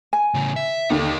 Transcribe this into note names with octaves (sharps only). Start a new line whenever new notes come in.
G#5
A2 C#3
E5
D#2 D3 D#4 G4